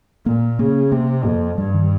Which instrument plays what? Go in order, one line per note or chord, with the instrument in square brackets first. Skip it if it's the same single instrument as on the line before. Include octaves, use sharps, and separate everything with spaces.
[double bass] A#2 [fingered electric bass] A#3
[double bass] C#3 [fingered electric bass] A#3
[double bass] C3 [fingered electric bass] A#3
[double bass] F2 [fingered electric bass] A#3
[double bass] G2 [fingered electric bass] G3
[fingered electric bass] D#3